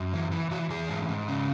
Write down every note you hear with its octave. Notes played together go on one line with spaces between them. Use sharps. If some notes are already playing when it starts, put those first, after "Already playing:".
Already playing: F#2
E3
E3
E3 F#4
E3 G#4
G#2
G#2
C#3